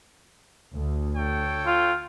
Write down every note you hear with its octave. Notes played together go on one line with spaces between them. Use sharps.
D2
A4 C#5 G5
F4